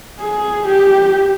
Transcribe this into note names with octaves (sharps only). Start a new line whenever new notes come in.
G#4
G4